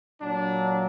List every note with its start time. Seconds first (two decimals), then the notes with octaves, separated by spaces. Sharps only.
0.22 A#2 F#3 D4